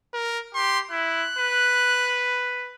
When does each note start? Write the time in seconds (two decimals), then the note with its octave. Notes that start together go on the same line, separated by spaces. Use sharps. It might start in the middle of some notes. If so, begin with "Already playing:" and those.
0.14 A#4
0.55 G4 C6
0.91 E4 F#6
1.39 B4